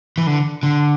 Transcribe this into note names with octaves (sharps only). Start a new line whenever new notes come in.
E3
D3
D3